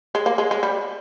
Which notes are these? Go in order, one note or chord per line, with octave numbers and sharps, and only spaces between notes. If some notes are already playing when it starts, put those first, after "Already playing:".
G#3
A#3
G#3
G#3
G3